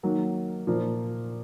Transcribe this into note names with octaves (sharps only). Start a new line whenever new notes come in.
D#3 F#3 A#3
A#2 F3 A#3